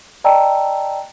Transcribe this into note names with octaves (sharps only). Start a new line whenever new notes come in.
D5 D#5 G5 A5 A#5 E6